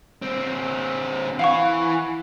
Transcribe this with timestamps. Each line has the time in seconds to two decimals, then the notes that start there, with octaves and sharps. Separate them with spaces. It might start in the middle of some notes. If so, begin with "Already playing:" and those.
0.22 D3 C4
1.39 E3 F5 F#5 C#6